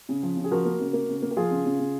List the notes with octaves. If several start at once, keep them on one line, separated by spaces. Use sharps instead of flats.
C#3
F3
C#3
G#4
F3 F#4 A#4
A#3
C#3
A#3
C#3
A#3
A#4
F3 F4 G#4
C#3
C#3
C#3